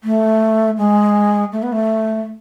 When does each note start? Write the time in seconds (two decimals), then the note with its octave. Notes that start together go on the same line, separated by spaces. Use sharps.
0.04 A3
0.78 G#3
1.52 A3
1.63 B3
1.72 A3